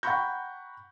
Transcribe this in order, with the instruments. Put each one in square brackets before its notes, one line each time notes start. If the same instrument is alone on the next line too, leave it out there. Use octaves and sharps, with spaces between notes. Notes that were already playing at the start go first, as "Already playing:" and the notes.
[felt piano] F#5 G5 A#5 B5 C#6 G6